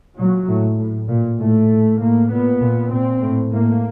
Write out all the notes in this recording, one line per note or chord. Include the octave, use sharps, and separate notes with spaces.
A#2 F#3
A2
A2
A#2
A2 A3
A2
A2 A#3
A#2 B3
A#2
A#2 C4
A2
A2 A#3